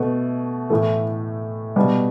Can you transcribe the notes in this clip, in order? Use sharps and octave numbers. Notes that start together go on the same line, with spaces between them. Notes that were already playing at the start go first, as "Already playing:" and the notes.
Already playing: B2 A3
A2 E3 A3
B2 G3